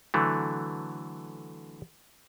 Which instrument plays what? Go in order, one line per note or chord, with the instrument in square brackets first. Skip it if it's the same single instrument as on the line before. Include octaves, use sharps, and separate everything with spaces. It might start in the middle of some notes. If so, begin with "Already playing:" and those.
[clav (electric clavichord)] D3 E3 F#3 A3